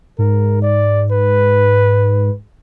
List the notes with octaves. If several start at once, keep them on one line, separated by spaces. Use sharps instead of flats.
G#2 A#4
D5
B4